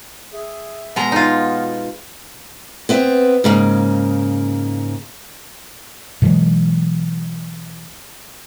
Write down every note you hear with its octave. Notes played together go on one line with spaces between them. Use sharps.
G#4 E5
B2 G#3 B3 A#5
D#4 F4
B3 C4 E5
G#2 C#3 A#3
B2 E3 F#3 G#3